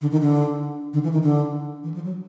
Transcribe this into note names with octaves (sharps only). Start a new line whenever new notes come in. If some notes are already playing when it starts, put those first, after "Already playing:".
D3
D#3
D3
D3
E3
D#3
D3
E3
F3
F#3